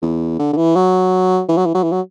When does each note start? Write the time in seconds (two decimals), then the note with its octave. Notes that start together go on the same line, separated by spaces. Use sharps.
0.02 E2
0.39 D3
0.53 D3
0.57 E3
0.76 F#3
1.49 E3
1.57 F#3
1.66 E3
1.74 F#3
1.83 E3
1.92 F#3